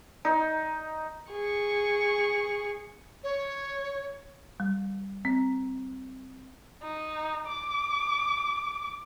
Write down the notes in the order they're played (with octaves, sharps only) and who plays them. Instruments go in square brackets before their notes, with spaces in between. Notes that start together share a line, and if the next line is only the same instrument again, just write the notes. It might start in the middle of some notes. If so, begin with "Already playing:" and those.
[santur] D#4
[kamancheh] G#4 C#6
[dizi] C#5
[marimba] G3
C4
[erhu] D#4
D6